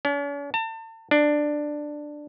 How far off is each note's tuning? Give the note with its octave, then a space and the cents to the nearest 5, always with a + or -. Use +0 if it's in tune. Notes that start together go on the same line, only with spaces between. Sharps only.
C#4 +45
A5 +35
D4 +10